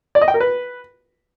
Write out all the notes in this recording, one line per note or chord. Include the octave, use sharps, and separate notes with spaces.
D5
D#5
G5
A#4
B4